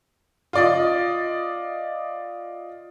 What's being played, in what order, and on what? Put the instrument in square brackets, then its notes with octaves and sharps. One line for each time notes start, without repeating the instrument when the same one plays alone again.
[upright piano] F4 D5 D#5